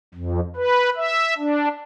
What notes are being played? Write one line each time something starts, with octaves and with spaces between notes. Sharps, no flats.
F2
B4
E5
D4